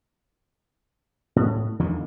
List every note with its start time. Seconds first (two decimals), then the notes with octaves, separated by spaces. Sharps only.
1.36 A2
1.80 E2 D3 D#3 F3